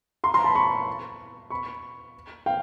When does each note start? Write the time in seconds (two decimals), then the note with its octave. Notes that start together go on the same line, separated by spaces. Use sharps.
0.24 A#5 C6
0.34 A#5 C6
0.44 A5 B5
0.55 B5 C#6
1.50 B5 C#6
2.46 F5 G5